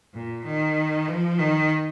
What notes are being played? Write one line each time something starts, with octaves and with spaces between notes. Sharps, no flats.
A#2
D#3
F3
D#3